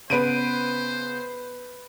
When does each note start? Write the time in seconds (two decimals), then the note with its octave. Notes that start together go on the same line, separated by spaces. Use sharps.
0.10 C#3 B3 B4 C5 D7 D#7